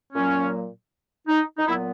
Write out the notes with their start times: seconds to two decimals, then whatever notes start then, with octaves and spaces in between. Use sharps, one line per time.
0.13 A#2 F#3 A#3 C#4
1.28 D#4
1.58 D#4
1.66 A#2 F#3 B3 E4